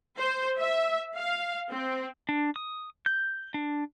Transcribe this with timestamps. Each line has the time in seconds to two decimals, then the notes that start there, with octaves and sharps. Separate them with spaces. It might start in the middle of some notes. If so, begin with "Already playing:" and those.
0.18 C5
0.59 E5
1.16 F5
1.72 C4
2.29 D4
2.56 D#6
3.06 G6
3.54 D4